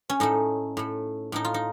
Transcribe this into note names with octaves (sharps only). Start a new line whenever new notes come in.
C#4
A2 A3 D#4
A2 A3
A2 A3 D#4
F4
D#4